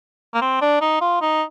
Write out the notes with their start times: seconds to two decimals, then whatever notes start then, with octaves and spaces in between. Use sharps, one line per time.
0.34 A#3
0.41 C4
0.62 D4
0.81 D#4
1.01 F4
1.22 D#4